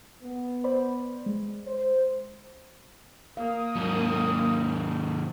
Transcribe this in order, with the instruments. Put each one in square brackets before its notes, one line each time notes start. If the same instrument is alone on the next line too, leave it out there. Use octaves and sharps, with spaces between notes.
[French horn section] B3
[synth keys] C5 D5 B5
G#3
[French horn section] C5
[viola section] A#3 [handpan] F5 [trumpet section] D#6
[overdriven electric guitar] D#2 G#2 [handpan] F#3